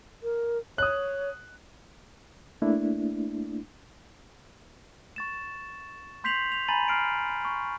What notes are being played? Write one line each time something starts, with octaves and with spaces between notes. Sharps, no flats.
A#4
C#5 D#6 F#6
A3 A#3 D4 E4
C#6 A6 E7
C6 G6 B6 C7 F7 F#7
F7
G#5 A#5 B5 A6 D#7 F#7
F6 C7 D7
C#6